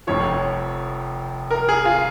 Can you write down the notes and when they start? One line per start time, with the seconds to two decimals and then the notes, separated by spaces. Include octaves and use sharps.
0.07 F1 F2 F3 C#5
1.51 A#4
1.69 G#4
1.85 F4